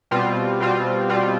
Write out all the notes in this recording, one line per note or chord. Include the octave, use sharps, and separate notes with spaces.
B2 G3 C4 F4
B2 G3 C4 F4
B2 G3 C4 F4